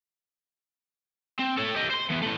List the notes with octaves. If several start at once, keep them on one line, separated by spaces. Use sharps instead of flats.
C4
A4 C#5
G4 D#5
C5 C6
E3 B3
E3 A3